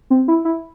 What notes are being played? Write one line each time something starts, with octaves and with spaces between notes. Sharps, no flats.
C4
E4
E4